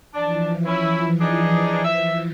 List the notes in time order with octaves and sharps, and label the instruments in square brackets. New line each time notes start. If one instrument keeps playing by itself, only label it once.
[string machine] E3 F3 [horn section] D4 A5
[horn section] C#4 E4
D4 D#4 G#4
E5